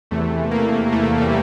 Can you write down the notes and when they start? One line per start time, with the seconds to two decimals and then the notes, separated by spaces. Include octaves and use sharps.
0.11 E2 C3 E3 A3
0.51 A#3
0.92 A3
1.21 G3